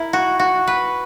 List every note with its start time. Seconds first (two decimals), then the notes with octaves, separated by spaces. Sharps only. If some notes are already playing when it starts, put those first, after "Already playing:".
Already playing: E4 A#4
0.13 F#4
0.39 F#4
0.67 B4